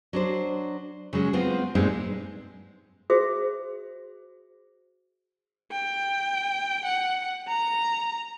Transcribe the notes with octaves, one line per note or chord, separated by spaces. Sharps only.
F#3 D4 C5
C#3 F#3 G#3
G#3 B3 C4 F4
G2 A#2 G#3 C4 D4 D#4
F#4 G#4 C5 E5
G5
F#5
A#5